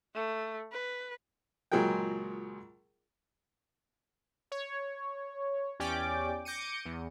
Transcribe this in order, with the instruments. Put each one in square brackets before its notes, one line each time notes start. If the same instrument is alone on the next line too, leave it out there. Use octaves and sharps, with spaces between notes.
[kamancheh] A3
B4
[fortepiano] C#2 A#2 F#3 G#4 A#4 G5
[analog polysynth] C#5
E2 C#4 G4 D5 G5 D6
D6 G6 A#6 C#7 D#7
E2